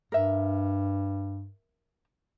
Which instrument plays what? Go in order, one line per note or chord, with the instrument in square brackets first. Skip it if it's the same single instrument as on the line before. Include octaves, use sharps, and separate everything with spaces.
[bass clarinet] G2 [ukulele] A#4 E5